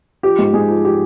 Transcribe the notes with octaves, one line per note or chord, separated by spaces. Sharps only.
F3 G4
G#2
G#2 G#4
F3
F3 G4